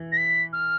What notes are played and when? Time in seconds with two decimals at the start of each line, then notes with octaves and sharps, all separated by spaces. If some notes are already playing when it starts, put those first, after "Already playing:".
Already playing: E3
0.12 A#6
0.17 B6
0.52 F6